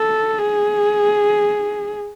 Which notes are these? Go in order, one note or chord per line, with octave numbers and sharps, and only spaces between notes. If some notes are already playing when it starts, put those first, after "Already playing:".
Already playing: A4
G#4